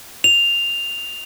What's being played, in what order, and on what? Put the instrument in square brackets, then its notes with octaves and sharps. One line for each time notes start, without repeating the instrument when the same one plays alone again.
[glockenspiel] F7